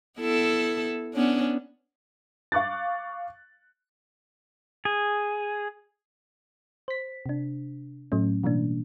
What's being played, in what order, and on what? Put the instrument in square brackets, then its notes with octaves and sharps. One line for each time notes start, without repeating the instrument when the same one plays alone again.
[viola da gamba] B3 E4 A4
B3 C#4 D4
[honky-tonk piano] F5 C#6 D6 F#6 A6
[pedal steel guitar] G#4
[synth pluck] C5 B6
C3 D4
A2 F#3 A3 C#4
B2 E3 G3 A#3 D4